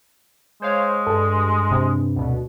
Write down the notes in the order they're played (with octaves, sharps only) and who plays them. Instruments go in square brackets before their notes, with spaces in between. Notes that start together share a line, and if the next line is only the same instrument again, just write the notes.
[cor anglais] G#3 [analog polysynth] C5 C#5 F5
[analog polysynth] G2 [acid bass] A4
[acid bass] C3
[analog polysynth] D2 B2